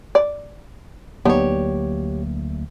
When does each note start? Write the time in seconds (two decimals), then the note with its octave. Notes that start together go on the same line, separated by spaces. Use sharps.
0.15 D5
1.25 D2 F#3 A#3 B3 D4 D#4 G4 C#5